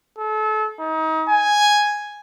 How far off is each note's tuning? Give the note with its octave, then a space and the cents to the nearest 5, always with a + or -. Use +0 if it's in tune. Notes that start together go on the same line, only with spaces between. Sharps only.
A4 -35
D#4 +30
G#5 +0